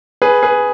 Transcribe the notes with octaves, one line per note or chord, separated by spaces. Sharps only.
G#4 B4
G#4 B4